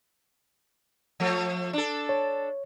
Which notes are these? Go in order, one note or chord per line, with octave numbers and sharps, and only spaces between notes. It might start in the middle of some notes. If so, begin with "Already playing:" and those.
F3 A3
D4 A4
C#5